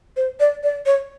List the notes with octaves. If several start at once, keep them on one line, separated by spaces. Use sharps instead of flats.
C5
D5
D5
C#5